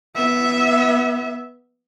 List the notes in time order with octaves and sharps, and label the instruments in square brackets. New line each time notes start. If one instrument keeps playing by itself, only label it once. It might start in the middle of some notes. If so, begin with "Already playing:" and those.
[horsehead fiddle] B3 E5